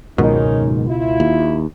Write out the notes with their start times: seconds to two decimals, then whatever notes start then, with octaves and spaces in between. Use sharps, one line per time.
0.18 F#1 C#2 G#2 B2 D#3 C#4 D#4 A#4
0.87 E4 F4
1.20 D#2